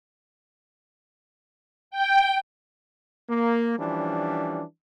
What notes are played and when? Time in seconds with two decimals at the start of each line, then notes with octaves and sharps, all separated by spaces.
1.91 G5
3.29 A#3
3.78 E3 F3 G3 C#4 D4